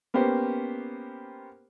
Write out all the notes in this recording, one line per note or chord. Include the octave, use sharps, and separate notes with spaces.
A#3 B3 C#4 G4 C5